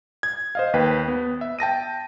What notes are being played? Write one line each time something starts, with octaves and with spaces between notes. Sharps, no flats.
G#6
C5 D#5 F5
D#2 B4 G5
B3
E5
G5 A5 A#6 D#7